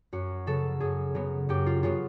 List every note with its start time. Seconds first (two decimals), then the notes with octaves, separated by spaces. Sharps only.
0.13 F#2 F#4
0.46 C#3 F#3 B3 A4
0.80 F#2 G#4
1.15 C#3 F#3 B3
1.49 F#2 G4
1.66 F4
1.83 C#3 F#3 B3 F4